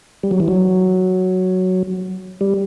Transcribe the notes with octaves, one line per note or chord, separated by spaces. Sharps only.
G3
F#3
E3
F#3
G3